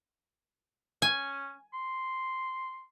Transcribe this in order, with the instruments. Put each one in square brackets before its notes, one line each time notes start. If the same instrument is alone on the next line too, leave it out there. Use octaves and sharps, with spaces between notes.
[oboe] C#4 [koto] G#5
[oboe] C6